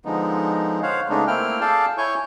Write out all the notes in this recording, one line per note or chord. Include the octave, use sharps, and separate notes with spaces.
D3 F3 G#3 B3 D#4
C5 C#5 F5 F#5
C#3 G#3 A3 B3 D4 D#4
A3 A#3 C4 E4 G5 F6
G#4 A4 D5 F5 G5 A5
E4 C#5 G#5 C#6 G6